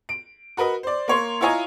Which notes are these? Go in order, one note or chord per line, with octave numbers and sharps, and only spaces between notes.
D7
F#4 A#4 B4 D#5
C5 D5
A#3 C#5 C6
E4 F4 C#5 D#5 G#5 A#5